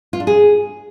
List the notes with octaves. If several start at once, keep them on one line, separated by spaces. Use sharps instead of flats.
F4
D4
G#4